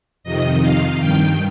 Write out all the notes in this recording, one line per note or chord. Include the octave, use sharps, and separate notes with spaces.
F2 C3 D#3 D#5
F5
G2 D#3 G5